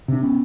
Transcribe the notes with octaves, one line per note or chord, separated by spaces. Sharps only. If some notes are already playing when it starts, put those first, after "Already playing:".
C3 D4
B3 C#4